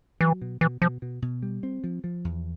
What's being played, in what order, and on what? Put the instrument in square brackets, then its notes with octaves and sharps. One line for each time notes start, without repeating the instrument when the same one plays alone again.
[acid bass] E3 [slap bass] F#3
[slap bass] B2
[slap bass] B2 [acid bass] E3
[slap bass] B2 [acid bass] F3
[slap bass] B2
B2
G3
C4
F3
F3
E2